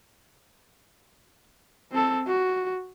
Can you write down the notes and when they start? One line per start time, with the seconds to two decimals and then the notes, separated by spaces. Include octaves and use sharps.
1.92 C4 A4
2.27 F#4